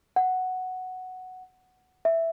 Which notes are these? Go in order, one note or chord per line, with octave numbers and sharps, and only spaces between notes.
F#5
E5